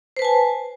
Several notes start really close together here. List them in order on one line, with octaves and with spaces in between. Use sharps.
C5 B4 A5 G#5